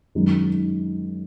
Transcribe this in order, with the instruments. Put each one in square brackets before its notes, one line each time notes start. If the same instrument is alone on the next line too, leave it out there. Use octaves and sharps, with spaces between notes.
[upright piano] F#2 D#3 G#3 D#4